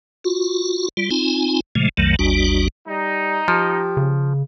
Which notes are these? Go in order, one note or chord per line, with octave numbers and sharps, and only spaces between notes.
F4 F#4
G3 F4
C4 D#4 F4 G#5
A#2 C#3 F3 G#3 A3
B1 F2 D#3 F#3 A3
G#1 D#2 G3 D4 F#4
G3 D#4
F3 G4
C#3